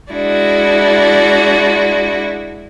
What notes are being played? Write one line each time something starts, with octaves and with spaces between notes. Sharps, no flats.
G#3 D4 E4 F#4